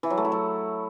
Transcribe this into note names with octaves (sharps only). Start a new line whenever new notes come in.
E3
F#3
A3
E4
F#3